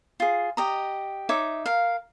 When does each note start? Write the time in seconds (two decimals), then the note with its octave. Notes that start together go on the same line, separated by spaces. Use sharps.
0.20 F4 G#4
0.57 G4 D#5 A#5
1.29 D#4 C#5 E5 D6
1.66 A#4 F5